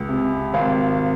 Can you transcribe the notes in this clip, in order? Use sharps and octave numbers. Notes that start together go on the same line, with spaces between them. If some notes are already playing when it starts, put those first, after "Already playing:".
Already playing: C#2
C3
G#1 F5